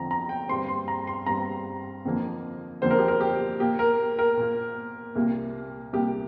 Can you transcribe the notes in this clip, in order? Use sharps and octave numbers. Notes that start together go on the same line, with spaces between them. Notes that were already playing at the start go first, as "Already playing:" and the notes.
Already playing: F2 D3 F3 C4 A#5
A#5
G5
G2 G3 C4 C6
C6
A#5
C6
G2 G3 C4 A#5
F2 D3 F3 A#3
F2 D3 F3 A#3 C5
A#4
G4
A#4
G4
A#2 A#3 G4
A#4
A#4
A#2 A#3
C2 A#2 G3 A#3
C2 A#2 G3 A#3 G4